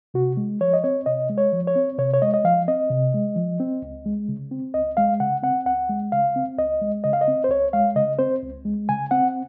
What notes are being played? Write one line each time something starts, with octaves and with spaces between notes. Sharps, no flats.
C3 F#4
G#3
F3 C#5
D#5
C4 C#5
C3 D#5
G#3
C#5
F3
C#5
C4
C3 C#5
C#5
G#3 D#5
D#5
F3 F5
C4 D#5
C3
G#3
F3
C4
C#2
G#3
C#3
C4
C#2 D#5
G#3 F5
C#3 F#5
C4 F#5
C#2 F#5
G#3
C#3 F5
C4
C#2 D#5
G#3
C#3 D#5
F5
D#5
C4
C5
C#2 C#5
G#3 F5
C#3 D#5
C4 C5
C#2
G#3
C#3 G#5
C4 F#5